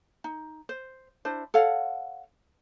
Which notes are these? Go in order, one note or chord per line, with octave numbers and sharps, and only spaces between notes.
D#4
C5
D4 E4 C5
A4 C#5 F5 F#5